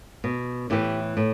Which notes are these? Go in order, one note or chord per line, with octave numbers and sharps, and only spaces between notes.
B2
A2 E3 E4 G4
A2